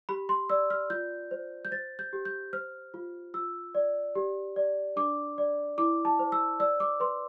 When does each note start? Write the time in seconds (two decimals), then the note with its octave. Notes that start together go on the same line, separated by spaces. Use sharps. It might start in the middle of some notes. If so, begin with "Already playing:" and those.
0.09 G4 B5
0.29 C6
0.50 D5 E6
0.70 F6
0.90 F4 G6
1.31 C5
1.65 G6
1.71 C5 A6
1.99 G6
2.13 G4
2.25 G6
2.53 C5 F6
2.94 F4
3.34 F4 E6
3.75 D5
4.15 G4
4.56 D5
4.96 D4 D6
5.38 D5
5.78 E4 D6
6.05 A5
6.19 C5
6.32 E6
6.60 D5 E6
6.80 D6
7.00 B4 C6